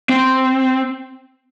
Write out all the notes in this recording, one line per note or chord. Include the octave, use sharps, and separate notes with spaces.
C4